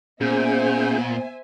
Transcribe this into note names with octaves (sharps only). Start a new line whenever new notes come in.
A#2 B3 C#4 G#4 C5 E5 G#5 G6